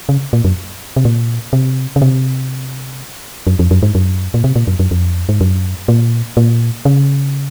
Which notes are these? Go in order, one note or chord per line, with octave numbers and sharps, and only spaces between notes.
C#3
A#2
F#2
C3
A#2
C3
C#3
C3
F#2
F2
F#2
G#2
F#2
A#2
C3
A#2
F#2
F#2
F2
G#2
F#2
A#2
A#2
C#3